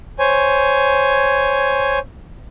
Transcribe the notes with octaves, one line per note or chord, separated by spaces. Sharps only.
C5 C#5 G#5